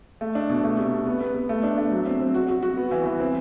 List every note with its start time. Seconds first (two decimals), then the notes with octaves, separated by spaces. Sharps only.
0.21 A3
0.35 D4
0.49 B2
0.64 A3
0.78 C3
0.92 C3
1.07 B3
1.21 B3
1.35 B3
1.49 A3
1.63 D4
1.78 A3
1.92 F#3
2.06 C4
2.20 C4
2.34 F#4
2.49 F#4
2.63 F#4
2.77 B3
2.91 E3
3.06 E3
3.20 C4